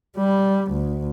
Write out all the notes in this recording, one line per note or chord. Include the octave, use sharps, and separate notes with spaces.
G3
D2